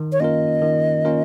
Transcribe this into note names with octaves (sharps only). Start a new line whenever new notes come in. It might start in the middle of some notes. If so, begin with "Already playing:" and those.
Already playing: D#3
C#5
A#3 C#4 F4 A#4 D#5
D#3
A#3 C#4 F4 A#4